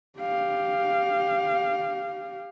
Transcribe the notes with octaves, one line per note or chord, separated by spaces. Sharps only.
G4 F5